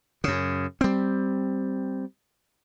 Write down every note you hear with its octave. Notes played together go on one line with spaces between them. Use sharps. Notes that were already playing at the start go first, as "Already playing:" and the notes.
F#2 C#3
G3 C4